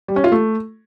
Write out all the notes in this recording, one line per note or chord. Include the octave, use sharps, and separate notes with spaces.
G3
C#4
F4
A3